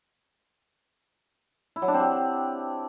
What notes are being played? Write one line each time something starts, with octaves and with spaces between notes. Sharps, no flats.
E4
F#3
D4
C4
G4